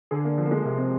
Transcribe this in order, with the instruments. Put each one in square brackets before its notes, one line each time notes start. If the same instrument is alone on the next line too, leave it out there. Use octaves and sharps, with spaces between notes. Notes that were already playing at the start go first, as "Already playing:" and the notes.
[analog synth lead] D3 [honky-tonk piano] G#4
[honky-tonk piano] A#3
F3
A#3
G#3
[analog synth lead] C3 [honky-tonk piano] A#3
[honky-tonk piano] C4